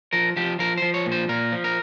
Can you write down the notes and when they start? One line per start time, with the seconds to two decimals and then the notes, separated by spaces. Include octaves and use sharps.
0.13 F3 A#4
0.36 F3 G4
0.59 F3 A#4
0.78 F3 C5
0.94 C#5
1.06 A#2
1.12 C5
1.28 A#2 A#4
1.52 F3
1.64 A#4